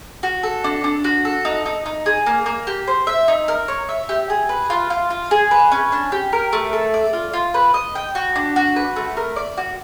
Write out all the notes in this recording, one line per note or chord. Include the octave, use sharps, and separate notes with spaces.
F#4
A4
D4
D4
F#4
A4
D#4
D#4
D#4
G#4
A#3
A#3
G4
C5
E5
D#4
A#4
C#5
E5
G4
G#4
B4
F4
F4
F4
G#4
B4
C#4
D4
G4
A#4
A3
A4
D5
F4
F4
B4
D#5
G5
F#4
D4
F#4
B4
A3
A#4
D5
F#4